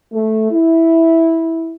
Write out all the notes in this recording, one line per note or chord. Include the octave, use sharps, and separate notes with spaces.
A3
E4